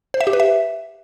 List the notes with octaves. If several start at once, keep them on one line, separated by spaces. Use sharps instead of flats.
C5
E5
G4
B4
E5